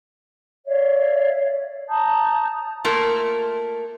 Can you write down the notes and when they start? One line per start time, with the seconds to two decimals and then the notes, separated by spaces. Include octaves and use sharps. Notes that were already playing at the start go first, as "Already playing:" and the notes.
0.65 C#5 D5 E5 F5
1.89 A5 A#5 D#6 G6
2.85 A3 A#3 F4 A#4